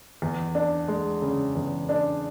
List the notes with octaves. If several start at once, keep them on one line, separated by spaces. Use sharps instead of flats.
E2
D4
G#3
C#3
E2
D4